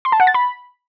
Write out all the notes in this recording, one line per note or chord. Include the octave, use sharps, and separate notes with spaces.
C6
A5
F#5
A6
B5